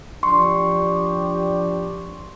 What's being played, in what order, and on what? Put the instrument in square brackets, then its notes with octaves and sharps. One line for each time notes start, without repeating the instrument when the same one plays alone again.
[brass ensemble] F3 D4 G4 [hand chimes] C6 C#6